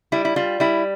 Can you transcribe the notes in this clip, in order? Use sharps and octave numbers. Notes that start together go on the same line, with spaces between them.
G3 E4
E4
G3 F4
G3 E4